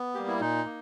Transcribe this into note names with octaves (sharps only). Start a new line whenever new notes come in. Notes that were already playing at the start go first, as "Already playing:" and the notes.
Already playing: B3
G3 A#3 G4
E4
A#2 D#4
A#3